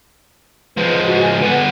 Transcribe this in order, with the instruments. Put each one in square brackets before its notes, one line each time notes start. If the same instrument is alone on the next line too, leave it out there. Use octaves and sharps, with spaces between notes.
[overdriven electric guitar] F3 G#3 [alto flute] B4
[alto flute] F#4
G#5
[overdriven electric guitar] D3 B3 [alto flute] B4